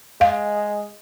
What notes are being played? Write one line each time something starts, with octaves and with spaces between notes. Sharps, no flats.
G#3 F5